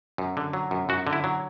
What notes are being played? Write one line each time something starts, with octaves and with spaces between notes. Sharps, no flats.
F#2
D3
F#3
F#2
F#2 F#4
D3
E4
F#3